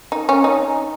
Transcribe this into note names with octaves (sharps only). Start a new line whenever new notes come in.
D#4
C#4
D#4